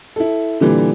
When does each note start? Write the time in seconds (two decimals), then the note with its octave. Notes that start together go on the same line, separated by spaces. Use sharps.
0.16 E4 A4
0.60 A#2 D3 E3 G3